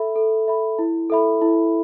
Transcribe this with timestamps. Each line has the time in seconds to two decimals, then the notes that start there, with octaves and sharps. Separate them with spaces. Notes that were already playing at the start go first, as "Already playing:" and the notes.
Already playing: A4 E5 B5
0.16 A4
0.48 E5 B5
0.79 E4
1.10 A4 E5 B5
1.42 E4